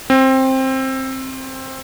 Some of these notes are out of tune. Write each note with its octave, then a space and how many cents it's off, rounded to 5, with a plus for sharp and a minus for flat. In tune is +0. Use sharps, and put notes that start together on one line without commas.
C4 +15